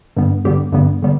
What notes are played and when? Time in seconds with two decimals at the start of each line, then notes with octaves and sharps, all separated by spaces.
0.17 G2 D3 G3 B3
0.45 G2 D3 G3 B3 G4
0.72 G2 D3 G3 B3
1.02 D3 G3 B3